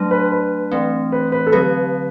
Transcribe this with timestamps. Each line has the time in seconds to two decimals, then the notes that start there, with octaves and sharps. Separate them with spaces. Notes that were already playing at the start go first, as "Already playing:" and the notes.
Already playing: F#3 A3 D4
0.11 B4
0.32 B4
0.72 E3 A3 C4
1.12 B4
1.32 B4
1.47 A4
1.52 D3 F#3 C4 G4 B4